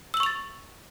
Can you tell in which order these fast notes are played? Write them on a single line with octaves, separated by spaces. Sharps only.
E6 F#7 C#6 F7 A6